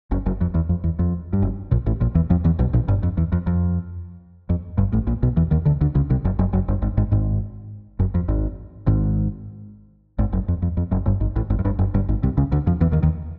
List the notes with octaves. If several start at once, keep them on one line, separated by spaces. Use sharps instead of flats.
F#1 F#2
F#1 F#2
F2
E2
F2
E2
F2
G2
F#1 F#2
A#1 A#2
A1 A2
A#1 A#2
E2 E3
F2 F3
E2 E3
B1 B2
A#1 A#2
G1 G2
F2
E2
F2
F2
F2
G1 G2
A1 A2
A#1 A#2
B1 B2
E2 E3
D#2 D#3
D2 D3
D2 D3
C#2 C#3
C2 C3
F#1 F#2
F#1 F#2
F#1 F#2
G1 G2
G#1 G#2
G#1 G#2
G#1 G#2
F#1 F#2
F2
G#1 G#2
G#1 G#2
G#1 G#2
F#1 F#2
F2
F2
F2
F#1 F#2
G1 G2
G#1 G#2
A1 A2
G#1 G#2
F#2
G1 G2
F#1 F#2
G1 G2
G#1 G#2
C2 C3
C#2 C#3
D2 D3
F2 F3
E2 E3
D#2 D#3
D#2 D#3